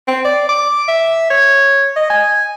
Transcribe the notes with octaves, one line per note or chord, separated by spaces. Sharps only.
C4
D5
D6
E5
C#5
D#5
G#5